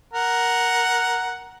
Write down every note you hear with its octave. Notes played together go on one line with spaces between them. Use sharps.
A#4 F#5